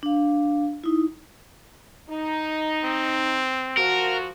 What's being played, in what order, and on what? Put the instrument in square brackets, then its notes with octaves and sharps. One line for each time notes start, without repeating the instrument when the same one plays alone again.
[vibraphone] D4 F5
D#4 E4
[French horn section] D#4
[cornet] C4
[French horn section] F3 F#4 [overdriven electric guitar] A#4